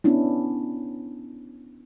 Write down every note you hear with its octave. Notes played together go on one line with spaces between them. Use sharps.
B3 C#4 D4 E4